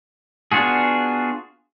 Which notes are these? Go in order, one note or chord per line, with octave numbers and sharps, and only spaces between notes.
B3 D4 F4 F#4 G#4